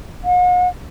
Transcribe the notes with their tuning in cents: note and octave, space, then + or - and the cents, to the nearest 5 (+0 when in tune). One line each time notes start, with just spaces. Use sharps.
F#5 -45